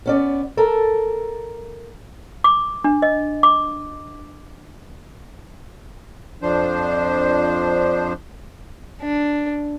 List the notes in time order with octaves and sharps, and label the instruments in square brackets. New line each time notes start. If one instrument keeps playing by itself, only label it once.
[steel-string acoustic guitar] B3 C#4 D5
A4 A#4
[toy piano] D6
D4
D#5
D6
[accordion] F2 F3 D4 C5
[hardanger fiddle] D4